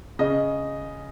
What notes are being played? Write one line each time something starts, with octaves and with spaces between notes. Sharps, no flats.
C#3 D#5